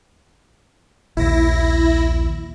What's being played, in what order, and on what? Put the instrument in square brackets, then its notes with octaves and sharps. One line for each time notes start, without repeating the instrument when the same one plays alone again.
[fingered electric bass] A#1 D#2 [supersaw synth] E4 A#6